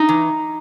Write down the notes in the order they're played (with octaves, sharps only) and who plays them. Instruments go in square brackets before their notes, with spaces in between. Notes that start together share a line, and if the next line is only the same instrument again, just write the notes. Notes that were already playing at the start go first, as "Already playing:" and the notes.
Already playing: [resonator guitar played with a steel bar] D#4
E3